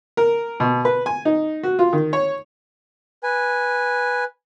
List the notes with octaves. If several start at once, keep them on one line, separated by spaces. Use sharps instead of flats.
A#4
B2
B4
G#5
D#4
F#4
F4
D#3
C#5
B4 G#5